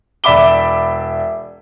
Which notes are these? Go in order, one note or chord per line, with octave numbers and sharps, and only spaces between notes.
E1 D5 E5 B5 D6 G7